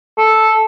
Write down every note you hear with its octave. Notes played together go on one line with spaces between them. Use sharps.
A4